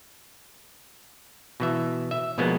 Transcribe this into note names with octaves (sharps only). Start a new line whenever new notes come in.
B2 E3 E5
E5
B2 F3 G#3 A#3 B3